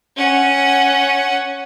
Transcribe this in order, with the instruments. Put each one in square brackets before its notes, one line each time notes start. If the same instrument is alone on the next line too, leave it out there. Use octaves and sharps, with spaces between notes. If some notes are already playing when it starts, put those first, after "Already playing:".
[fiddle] C#4 F#5